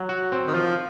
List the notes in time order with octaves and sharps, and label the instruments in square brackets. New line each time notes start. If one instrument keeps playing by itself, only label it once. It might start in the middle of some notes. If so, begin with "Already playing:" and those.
Already playing: [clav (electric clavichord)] F#3
F#4
C4
[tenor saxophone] D#3
[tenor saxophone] F3 [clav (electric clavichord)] F4